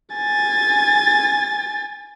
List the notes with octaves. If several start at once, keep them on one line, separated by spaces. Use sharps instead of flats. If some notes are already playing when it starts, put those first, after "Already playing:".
G#5 A6